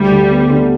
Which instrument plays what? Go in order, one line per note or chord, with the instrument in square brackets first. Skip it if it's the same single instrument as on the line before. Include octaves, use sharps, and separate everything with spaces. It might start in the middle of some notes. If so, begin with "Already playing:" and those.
Already playing: [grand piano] D2 [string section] G3
[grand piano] D3
B3
D3